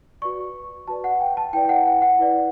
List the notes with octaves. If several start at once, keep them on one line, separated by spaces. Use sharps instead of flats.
F#4 B4 D5 C#6
F#4 B4 D5 A5
F#5
G5
A5
E4 B4 D5 G5
G5
F#5
F#5
F#5
E4 B4 D5